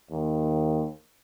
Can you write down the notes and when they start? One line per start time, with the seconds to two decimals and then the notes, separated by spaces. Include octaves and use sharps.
0.11 D#2